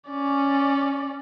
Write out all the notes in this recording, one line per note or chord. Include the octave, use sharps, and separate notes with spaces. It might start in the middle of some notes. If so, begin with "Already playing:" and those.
C#4 D5